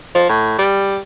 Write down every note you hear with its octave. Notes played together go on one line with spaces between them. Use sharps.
F3
A2
G3